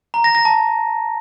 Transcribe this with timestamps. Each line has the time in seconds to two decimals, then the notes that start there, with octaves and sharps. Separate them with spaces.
0.14 A#5
0.24 A#6
0.35 A#6
0.45 A5